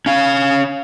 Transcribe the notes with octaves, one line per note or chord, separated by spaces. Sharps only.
C#4 F5